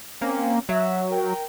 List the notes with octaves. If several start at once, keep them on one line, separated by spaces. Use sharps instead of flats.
A#3 C4 C#4
F#3 E5
A#4 G5